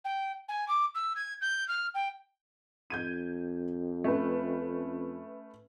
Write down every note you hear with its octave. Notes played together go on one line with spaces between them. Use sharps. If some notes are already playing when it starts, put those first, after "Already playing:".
G5
G#5
D6
E6
G#6
G6
F6
G5
F2 G6 G#6 D#7
A3 C#4 B4